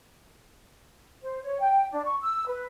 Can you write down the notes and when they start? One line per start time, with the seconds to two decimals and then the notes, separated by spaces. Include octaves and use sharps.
1.23 C5
1.43 C#5
1.60 G5
1.92 D4
2.05 C#6
2.21 E6
2.47 B4